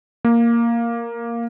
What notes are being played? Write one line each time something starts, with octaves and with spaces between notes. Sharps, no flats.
A#3